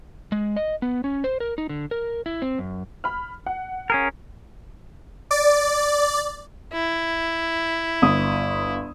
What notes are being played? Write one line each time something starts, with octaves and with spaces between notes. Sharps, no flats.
G#3
D#5
B3
C#4
C5
A#4
D#4
D3
A#4
E4
C4
F#2
B5 F6
F#5
C#4 G#4 A#4
D5
E4
G1 D#6